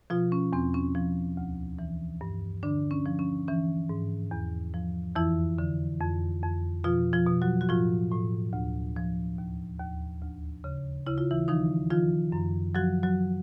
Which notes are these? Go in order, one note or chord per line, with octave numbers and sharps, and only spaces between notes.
B2 F3 F4
C#4
E2 C4
C#4
F3
D2
E3
G2
D3 D4
C#4
F3
C#4
E3 C#4
G#2
E2
F3
F2 E3 E4
D3
F2
F2
B2 F3 F4
F3 F4
B2
F#3 F#4
F#4
A2 F3 F4
A2
D2
F3
D#2
D#2
D2
C#3
C#3 E4
F4
E3 E4
D#3 F3 D#4
D#3 F3 F4
F#2
F3 F#3 F#4
F#3 F#4